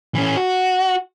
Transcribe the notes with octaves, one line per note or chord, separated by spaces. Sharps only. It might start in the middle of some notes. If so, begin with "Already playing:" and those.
E3 C#4
F#4